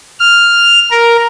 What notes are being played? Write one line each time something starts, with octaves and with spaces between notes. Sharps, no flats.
F6
A#4